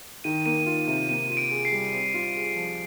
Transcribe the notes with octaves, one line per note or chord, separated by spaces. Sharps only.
D#3 D#7
A#3 D#7
F4 D#7
C3 D#7
A#3 D#7
F4 D#7
D7
G#4
C7
G3
C4
F4
G#4
F3